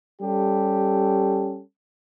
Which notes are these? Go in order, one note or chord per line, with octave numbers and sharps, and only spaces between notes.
G3 C#4 G4 A4